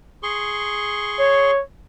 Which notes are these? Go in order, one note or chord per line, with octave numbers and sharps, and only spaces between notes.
G#4 C6 C#6
C#5